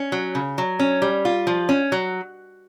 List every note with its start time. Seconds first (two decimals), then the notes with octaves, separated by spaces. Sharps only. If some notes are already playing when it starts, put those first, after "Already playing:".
Already playing: C#4
0.12 F#3
0.35 C#3
0.58 F#3
0.79 C#4
1.02 G3
1.25 F4
1.47 F3
1.69 C#4
1.92 F#3